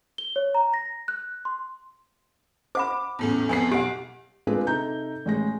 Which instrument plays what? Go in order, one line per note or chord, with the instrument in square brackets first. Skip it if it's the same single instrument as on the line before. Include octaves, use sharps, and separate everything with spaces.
[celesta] G7
C#5
A#5
A#6
F#6
C6
[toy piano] C5 F#5 B5 [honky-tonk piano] D6
[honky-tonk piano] E2 A2 C#4
[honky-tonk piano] F2 B3 C7 [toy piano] G#5
[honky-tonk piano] B1 D7 [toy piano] G4 F#5
[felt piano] G#3 C4 D4 F4 G#4 B4
C3 D#4 A4 A#5 G6
A1 G#3 A#6